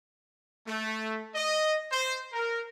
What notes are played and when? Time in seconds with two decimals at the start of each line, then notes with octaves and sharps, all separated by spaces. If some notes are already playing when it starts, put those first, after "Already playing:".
0.66 A3
1.34 D#5
1.90 C5
2.33 A#4